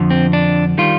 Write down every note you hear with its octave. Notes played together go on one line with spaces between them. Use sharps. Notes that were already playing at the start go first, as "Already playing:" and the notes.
Already playing: F2 D3 F3
C4
D4
D#3 G3 F4